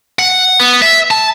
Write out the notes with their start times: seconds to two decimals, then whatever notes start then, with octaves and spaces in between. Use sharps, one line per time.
0.19 F#5
0.60 B3
0.82 E5
1.11 A5